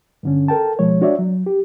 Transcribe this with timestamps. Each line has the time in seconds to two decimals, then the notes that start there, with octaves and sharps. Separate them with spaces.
0.23 G2 D3 C#4
0.48 A4 A#4 G5 A5
0.79 B2 F3 G#3 C#5
1.01 D4 F#4 C#5 D5 E5
1.19 F#3
1.46 G4